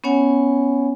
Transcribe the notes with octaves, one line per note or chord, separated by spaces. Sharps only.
B3 C#4 C#5 F#5 G#5